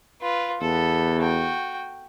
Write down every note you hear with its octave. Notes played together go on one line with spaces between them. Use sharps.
F4 B4
E2 B3 A4
F#4 G5